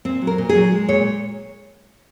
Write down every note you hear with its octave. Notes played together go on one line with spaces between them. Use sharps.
A#2 C4
F#3
A#4
A#2
G#4
F#3
G#3
A#2 C#5